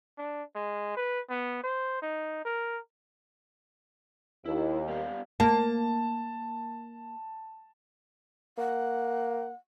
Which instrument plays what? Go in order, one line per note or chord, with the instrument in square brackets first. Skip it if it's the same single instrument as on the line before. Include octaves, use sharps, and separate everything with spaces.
[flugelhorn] D4
G#3
B4
B3
C5
D#4
A#4
[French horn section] D#2 [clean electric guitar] E4
[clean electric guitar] G3 B3 F5
[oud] A#3 [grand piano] A5
[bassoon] A#3 [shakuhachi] F#5